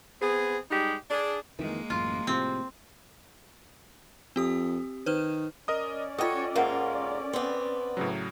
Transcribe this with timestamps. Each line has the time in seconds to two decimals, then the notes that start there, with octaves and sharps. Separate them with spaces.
0.21 B3 C4 G#4
0.70 G3 G#3 D#4 G4
1.09 D4 G#4
1.59 F2 D#3 E3 G#3 A#3
1.90 A1 F#2 F4
2.27 A2 C3 F3 C4
4.36 F2 C4 G4 D#6
5.06 D#3 B4 C5 F6
5.68 C#4 A#4 D5 D#5 D#6
6.18 F4 F#4 A4 C#5 D#5 G5 D#6
6.55 G#2 A#3 F4 A#4 E5 F#5
7.33 B3 C4
7.97 A2 C#3 F#3